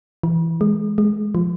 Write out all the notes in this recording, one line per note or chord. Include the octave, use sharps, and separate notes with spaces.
E3
G#3
G#3
F3